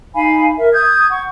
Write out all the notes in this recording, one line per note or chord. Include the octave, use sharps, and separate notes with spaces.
D#4 F5 G#5 B5
A#4 E5
D#6 G6 G#6
F#5 C#6